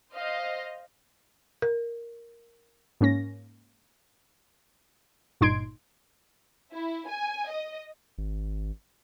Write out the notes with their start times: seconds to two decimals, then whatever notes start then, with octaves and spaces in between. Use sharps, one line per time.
0.14 C5 D#5 F5
1.62 A#4
3.01 G#2 A#3 C#4 A#6
5.41 G1 A#2 D#4 C6 G#6 D7
6.73 E4
7.09 G#5
7.50 D#5
8.18 G#1